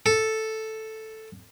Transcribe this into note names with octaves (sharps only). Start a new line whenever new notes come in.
A4